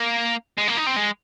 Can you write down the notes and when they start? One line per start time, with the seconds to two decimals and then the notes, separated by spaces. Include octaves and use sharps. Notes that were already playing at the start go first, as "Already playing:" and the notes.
Already playing: A#3
0.58 G#3
0.68 A#3
0.77 D#4
0.87 C4
0.96 G#3